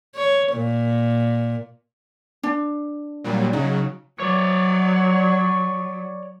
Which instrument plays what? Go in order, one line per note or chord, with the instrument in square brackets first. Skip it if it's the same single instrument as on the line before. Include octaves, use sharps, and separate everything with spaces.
[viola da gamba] C#5
A#2
[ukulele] D4
[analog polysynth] A#2 F#3 G3
[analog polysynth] C#3 F#3 [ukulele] D#4
[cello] F#3 [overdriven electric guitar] C#5 D5